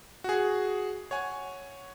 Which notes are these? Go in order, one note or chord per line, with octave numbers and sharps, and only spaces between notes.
F#4 G#4
C#5 F#5 G#5